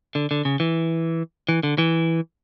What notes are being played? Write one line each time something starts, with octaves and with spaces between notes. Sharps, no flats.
D3
D3
C#3
E3
E3
D3
E3